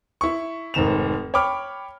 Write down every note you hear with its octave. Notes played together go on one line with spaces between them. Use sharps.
E4 C#6
F1 G#2 D#3 E7 F7
C#5 G5 B5 D6 F6